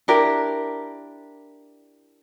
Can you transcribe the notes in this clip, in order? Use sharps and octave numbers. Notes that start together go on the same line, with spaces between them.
D4 E4 G4 A#4